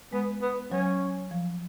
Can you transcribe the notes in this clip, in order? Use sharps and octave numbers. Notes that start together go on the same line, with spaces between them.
G#3 B3
B3
F#3 C#4
F3